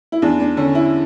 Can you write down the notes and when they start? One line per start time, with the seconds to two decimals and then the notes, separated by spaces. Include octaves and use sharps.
0.12 E4
0.22 E2 D4
0.40 D4
0.57 D3 C#4
0.75 E4